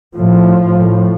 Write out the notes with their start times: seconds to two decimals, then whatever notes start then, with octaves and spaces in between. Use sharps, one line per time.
0.16 A2 F3
0.76 A2